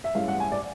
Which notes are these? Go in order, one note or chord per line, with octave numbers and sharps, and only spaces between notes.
E5
A1 G2 E3 G#3 C#4 F5
F#5
G#5
D5